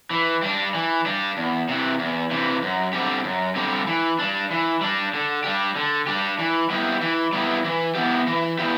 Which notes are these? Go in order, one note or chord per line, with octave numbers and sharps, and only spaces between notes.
E3
G3 D4
E3
G3 D4
E2
C3 E3
E2
C3 E3
F#2
D3 G3 C4 G4
F#2
D3 G3 C4 G4
E3
G3 D4
E3
G3 D4
D3
G3 D4 G4
D3
G3 D4 G4
E3
G3 B3 E4 G4
E3
G3 B3 E4 G4
E3
B3 E4 G4
E3
B3 E4 G4